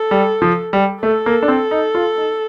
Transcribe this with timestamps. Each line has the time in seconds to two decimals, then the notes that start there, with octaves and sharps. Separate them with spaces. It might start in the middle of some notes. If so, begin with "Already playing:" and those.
Already playing: A4
0.11 G3
0.42 F3
0.73 G3
1.03 A3 A4
1.26 A#3
1.43 D4
1.48 C4
1.71 D#4
1.95 F4
2.17 D#4